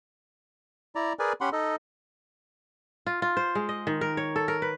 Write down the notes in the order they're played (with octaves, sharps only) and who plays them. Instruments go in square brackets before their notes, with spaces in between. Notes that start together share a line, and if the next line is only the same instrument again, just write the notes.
[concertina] E4 D5 A#5
G#4 A#4 B4 D5 G#5
C#4 G4 F#5 B5 C6
D#4 A4 D#5
[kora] F4
F4
C5
G#3
D#5
D#3
A#4
C#5
A4
A#4
B4